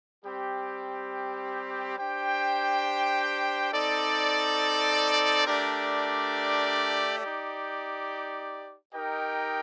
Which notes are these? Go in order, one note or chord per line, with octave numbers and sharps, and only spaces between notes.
G3 C4 G4
D4 G4 C5 G5
C4 D#4 A4 D5
A3 D4 G4 A#4 D5
D#4 G4 D5
D#4 G4 A#4 D#5 G5